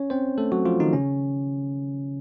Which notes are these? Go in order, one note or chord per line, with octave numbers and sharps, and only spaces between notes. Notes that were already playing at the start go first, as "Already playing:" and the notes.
Already playing: C#4 C#5
C4 C5
A3 A4
F#3 F#4
F3 F4
D#3 D#4
C#3 C#4